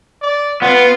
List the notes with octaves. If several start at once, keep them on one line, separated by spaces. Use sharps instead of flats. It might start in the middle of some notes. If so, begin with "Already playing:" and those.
D5
B3 F4